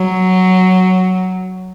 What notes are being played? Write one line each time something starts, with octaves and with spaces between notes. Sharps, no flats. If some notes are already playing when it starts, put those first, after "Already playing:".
Already playing: F#3